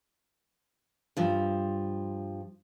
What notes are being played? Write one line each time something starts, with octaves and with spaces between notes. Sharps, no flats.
G2 F3